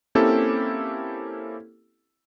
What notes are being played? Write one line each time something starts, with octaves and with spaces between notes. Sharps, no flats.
A#3 C4 C#4 E4 G4 A4